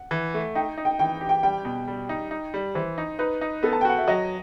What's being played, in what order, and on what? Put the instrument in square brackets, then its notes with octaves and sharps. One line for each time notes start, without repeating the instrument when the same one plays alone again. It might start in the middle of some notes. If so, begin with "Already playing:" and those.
Already playing: [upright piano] F#5
[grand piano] E3
A3
[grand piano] D#4 [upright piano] G5
[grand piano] D#4
[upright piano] G5
[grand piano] E3 [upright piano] G5
[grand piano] G4
[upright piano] G5
[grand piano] G3 [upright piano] G5
[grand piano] B2
G3
D#4
D#4
G3
[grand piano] E3 [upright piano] C5
[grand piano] D#4
[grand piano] D#4 [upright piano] B4
[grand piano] D#4
[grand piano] B3 [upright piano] A4
[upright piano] A5
G5
[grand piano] F#4 [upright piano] F#5
[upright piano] E5
[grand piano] F#3 [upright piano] D#5